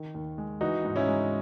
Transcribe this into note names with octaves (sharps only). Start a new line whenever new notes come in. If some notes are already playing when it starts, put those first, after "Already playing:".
Already playing: D#3
D#2
G#3
E3 D#4 F#4
G#2
C#4 E4
G#3